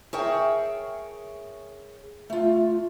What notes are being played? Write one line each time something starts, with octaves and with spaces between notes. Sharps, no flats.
G#4 A#4 C#5 E5 G5 A5
A3 F4